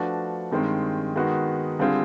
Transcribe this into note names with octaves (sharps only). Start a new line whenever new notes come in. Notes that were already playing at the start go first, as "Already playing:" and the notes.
Already playing: F3 A3 D4 F#4 B4
G2 D#3 G#3 C4
D#3 G#3 B3 D#4 F#4
D3 G3 C4 F4 G#4